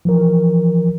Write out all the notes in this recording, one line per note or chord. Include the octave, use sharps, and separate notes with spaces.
E3 F3 A#4